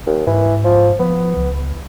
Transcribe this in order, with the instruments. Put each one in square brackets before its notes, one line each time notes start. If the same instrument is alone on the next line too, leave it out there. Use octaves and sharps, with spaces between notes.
[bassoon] D#2
[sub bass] G#2 [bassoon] E3
[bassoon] F3
[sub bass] F3 [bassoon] B3
[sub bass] C#2